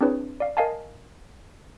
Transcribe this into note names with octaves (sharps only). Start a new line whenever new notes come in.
C4 D4 E4 G#4 B4 C#5
D5 F5
A#4 D#5 F5 G#5 A5